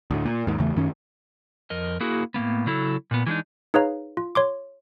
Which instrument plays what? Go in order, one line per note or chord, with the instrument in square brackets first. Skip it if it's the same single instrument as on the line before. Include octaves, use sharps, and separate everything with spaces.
[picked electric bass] D2 A2
A#2
D#2 G#2
E2 C#3 E3 A3
F#2 D#3 C#4
[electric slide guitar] F2 A#4 D#5
A#3 E4 F#4 G#4 A#4
A2 G#3 A#3 B3
C#3 F#3 E4 A4
A#2 B3
E3 G#3 D4 D#4
[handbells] D#4 G#4 B4 C#5 F5 A#5
F4
C#5 C6 D6